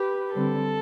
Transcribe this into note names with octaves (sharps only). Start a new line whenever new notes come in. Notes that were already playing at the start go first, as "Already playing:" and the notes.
Already playing: G4 B4
D3 G3 C4 A4